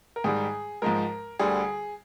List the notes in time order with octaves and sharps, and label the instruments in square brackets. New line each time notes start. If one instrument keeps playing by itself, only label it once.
[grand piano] A#4
G#2 D#3 G3 G#4
G#2 F3 G#3 A#4
D2 D3 G3 G#4